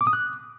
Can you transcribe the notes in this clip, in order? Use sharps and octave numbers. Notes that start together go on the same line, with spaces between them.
D6
D#6
F#6